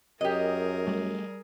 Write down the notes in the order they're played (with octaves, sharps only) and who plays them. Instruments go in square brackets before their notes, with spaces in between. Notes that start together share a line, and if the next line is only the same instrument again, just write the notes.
[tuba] F#2 [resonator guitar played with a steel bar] G4 D#5 [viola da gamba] G#4 A#4
[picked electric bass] G3 A3